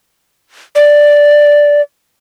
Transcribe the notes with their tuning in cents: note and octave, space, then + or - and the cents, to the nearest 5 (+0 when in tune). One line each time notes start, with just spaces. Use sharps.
D5 +0